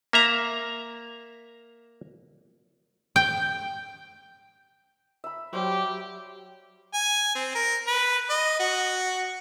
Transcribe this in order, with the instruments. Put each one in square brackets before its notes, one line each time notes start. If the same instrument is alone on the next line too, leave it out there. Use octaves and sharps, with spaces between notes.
[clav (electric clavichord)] A#3 E5 A#5
[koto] G5
[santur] E5 B5
[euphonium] F#3 [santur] G3 C5 [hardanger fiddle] G4
[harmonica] G#5
C4
A#4
B4
D#5
F#4